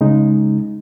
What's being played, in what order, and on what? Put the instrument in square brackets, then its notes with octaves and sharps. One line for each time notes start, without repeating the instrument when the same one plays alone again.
[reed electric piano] C#3 G#3 D#4